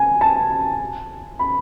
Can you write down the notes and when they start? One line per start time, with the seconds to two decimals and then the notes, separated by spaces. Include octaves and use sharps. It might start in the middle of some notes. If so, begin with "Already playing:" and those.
Already playing: G#5
0.21 A5
1.39 B5